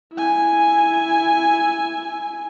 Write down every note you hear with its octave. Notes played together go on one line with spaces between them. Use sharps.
E4 G#5